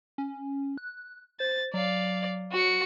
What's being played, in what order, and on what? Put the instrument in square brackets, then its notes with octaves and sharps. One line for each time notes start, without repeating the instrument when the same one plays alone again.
[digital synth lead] C#4
F#6
[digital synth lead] C5 [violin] A6
[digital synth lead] F#3 [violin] D5 F5
[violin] F#4 C#7